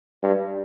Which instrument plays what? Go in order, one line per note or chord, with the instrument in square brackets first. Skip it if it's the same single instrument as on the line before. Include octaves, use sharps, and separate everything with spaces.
[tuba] G2